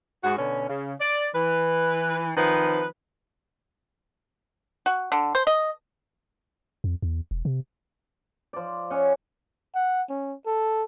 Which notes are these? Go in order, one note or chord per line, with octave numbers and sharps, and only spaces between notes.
G#2 F#4
B2 D3 C#4
C#3
D5
E3 B4
D#3 F3 C4 B4
F#4
D3
C5
D#5
F2
E2
E1
C3
F3 D5
C#4 C#5 D#5 F#5
F#5
C#4
A4